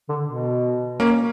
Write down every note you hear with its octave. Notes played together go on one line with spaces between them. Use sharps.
D3
B2
A#3 C#4